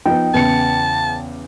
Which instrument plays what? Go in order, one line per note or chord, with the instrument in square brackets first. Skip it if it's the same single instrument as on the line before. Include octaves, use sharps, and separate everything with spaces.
[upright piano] F3 B3 [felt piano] D#4 [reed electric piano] G5
[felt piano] E2 C#3 C#7 [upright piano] B3 [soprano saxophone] A5